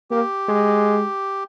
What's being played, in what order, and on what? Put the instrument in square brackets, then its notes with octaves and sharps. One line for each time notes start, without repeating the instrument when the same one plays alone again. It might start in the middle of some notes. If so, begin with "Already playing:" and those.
[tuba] A#3 [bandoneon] G4
[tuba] G#3